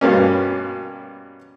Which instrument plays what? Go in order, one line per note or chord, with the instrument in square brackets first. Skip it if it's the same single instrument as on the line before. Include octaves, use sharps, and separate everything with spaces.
[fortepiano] G2 B2 A#3 C#4